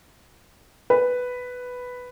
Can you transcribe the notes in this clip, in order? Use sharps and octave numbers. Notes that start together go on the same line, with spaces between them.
B4